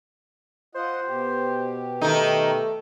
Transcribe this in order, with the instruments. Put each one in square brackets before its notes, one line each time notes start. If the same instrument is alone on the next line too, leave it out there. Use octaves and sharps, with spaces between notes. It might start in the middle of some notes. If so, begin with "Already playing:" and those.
[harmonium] F4 D#5 F#5 [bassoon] C5
[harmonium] B2 G4
[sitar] D#3 D#4 [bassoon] A3